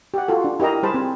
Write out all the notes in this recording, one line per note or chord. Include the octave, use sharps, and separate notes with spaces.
G4 F#5
F4 F#4 A4
D4
E4 G4 A#4 D#5 A#5
G3 G#4 C5 A5 B5
C4